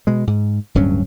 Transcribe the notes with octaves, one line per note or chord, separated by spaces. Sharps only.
B2 G#3
G#2
D1 G2 F#3 C#4